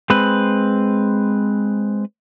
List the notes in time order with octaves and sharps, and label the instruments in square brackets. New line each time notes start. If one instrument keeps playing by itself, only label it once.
[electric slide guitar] G#3 C4 B4